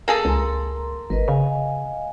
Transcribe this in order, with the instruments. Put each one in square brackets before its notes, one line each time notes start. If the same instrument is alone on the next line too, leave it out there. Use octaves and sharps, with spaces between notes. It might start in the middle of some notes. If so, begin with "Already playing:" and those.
[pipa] A#3 G#4 A4
[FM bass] C#2 [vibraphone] A#4 A#5 C6
[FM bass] G#1 [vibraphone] A#4 B4 D#5
[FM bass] C#3 [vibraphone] D#5 F5 G#5